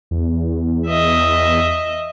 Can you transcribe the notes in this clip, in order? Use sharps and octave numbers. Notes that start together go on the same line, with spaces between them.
E2
D#5 E5